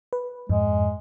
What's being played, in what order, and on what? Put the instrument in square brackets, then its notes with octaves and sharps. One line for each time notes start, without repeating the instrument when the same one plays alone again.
[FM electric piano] B4
[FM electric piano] F2 G#2 [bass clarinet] G#3